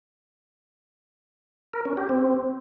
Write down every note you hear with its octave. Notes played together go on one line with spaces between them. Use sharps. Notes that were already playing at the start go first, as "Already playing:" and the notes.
A#4
C#4
G4
C4